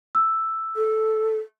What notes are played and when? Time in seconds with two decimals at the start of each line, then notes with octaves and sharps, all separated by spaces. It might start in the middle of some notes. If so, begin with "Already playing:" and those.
0.15 E6
0.75 A4